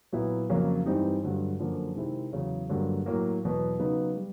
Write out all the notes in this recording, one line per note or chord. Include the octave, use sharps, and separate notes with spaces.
A#2 F#3 B3 E4
F2 C#3 F#3 A#3 C#4
G2 E3 G3 C4 D#4
G2 D3 F#3
F#2 D3 F3 A#3
C3 D#3 G#3 C4 E4
E2 C#3 F#3
G2 D3 F#3 A#3
A2 F#3 A#3
E2 B2 F#3 B3
C#3 F#3 B3 D#4
G3